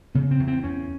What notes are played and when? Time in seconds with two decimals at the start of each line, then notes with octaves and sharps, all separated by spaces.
0.14 C#3 B3
0.31 C4
0.39 E2
0.48 C4
0.63 E2 C#4